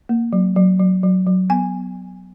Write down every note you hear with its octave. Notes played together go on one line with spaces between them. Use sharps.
A#3
F#3
F#3
F#3
F#3
F#3
B3 G#5